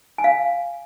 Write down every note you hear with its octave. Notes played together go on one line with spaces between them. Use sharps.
G#5
F5
G#5